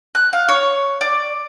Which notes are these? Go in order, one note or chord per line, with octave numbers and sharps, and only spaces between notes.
F#6
F5
C#5
D5